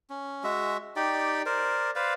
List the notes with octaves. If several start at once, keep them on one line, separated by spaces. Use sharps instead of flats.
C#4
G#3 F#4 E5
D#4 G4 D5 G5
A#4 C5 D5
B4 C5 D5 F5